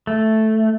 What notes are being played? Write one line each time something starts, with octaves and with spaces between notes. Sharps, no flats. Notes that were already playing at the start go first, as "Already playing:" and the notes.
A3